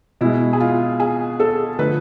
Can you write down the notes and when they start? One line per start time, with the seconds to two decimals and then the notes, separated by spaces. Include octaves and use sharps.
0.21 B2 G#3 E4
0.53 G#4
0.60 F4
1.00 G#4
1.40 A4
1.79 D3 F3 A3 B4